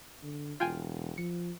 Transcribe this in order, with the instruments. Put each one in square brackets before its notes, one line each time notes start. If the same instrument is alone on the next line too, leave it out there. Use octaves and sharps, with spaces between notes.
[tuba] D3
[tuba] E1 [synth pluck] F4 G5 G#5
[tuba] F3 [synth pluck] C#7